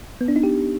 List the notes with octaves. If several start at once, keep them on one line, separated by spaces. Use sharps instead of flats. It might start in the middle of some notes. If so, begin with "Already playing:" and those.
B3
D4
D#4
G4